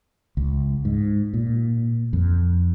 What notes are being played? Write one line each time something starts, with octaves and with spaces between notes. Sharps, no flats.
C#2
G#2
A#2
F2